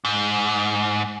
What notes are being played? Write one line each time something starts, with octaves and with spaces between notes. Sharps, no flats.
G#2